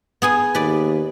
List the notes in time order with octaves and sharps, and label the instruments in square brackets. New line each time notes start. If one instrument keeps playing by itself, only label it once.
[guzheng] B3 G#4 G#5
[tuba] D#2 [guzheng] B4 D5